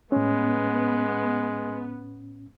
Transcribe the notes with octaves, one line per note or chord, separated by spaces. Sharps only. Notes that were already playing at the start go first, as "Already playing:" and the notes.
A2 G#3 B3 C#4